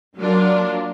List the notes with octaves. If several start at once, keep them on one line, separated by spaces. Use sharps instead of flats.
F#3 A#3 D4 F4 A#4